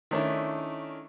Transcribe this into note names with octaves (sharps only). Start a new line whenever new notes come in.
D#3 A3 C#4 D4 E4